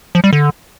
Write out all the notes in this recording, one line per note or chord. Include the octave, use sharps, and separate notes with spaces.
F3
G3
D3